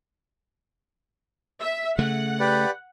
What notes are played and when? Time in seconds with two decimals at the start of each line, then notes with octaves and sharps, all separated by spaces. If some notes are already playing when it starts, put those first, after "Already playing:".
1.61 E5
1.98 C#3 A3 F#5
2.40 G4 B4 D5